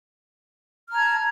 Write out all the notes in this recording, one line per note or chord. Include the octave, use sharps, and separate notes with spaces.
A5 A#5 F6 G#6